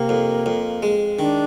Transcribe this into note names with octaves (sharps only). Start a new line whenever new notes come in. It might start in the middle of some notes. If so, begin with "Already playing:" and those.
Already playing: C3 A#3
F2
F2
G#3
D#3 D4